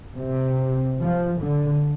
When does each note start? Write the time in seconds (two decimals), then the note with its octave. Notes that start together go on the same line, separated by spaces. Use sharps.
0.17 C3
0.99 F3
1.40 D3